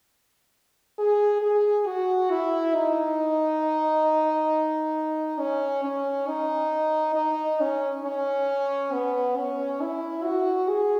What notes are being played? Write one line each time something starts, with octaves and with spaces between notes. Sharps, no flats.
G#4
G#4
F#4
E4
D#4
C#4
C#4
D#4
D#4
C#4
C#4
B3
C#4
E4
F#4
G#4